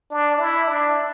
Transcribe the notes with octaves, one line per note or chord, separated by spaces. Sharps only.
D4
E4
D4